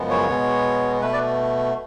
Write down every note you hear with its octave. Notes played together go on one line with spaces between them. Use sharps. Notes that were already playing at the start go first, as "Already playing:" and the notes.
Already playing: F#2 C#3 F3 G#3 B3
C#5
B2 G#3 B3
B2 A3 B4
D5